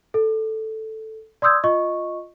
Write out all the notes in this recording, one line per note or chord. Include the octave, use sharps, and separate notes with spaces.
A4
D5 C6 D#6 E6 G6 G#6
F4 D#5 C#6